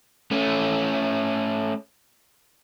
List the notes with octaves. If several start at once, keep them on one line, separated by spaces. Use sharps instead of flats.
A3 C#4